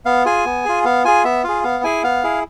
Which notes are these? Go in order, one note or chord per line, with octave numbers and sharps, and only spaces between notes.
B3 F5
F4 G#4 G#5
B3
F4 G#4
B3 F5
F4 G#4 G#5
B3 E5
F4 G#4 F5
B3 F5
E4 G#4 G#5
B3 F5
E4 G#4